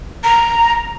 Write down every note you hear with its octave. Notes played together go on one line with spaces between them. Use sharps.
A#5